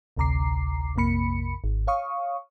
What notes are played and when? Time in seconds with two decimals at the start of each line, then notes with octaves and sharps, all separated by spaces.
0.17 A1 D2 C3 A#5 D6 C7
0.95 A#1 F2 C3 A#3 B5 C#7
1.64 G#1
1.87 C#5 F5 C#6 D#6